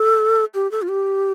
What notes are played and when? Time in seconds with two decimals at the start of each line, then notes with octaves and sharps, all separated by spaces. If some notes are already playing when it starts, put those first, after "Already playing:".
Already playing: A4
0.55 G4
0.71 A4
0.82 F4
0.88 G4